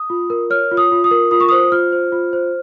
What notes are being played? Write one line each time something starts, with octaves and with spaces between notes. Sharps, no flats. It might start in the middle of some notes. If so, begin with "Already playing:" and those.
Already playing: D#6
F4
A#4
C#5 F6
F4
D#6
F4
D#6
A#4
F4 D#6
C#6
C5 D#6
F4 F6
C5
F4
C5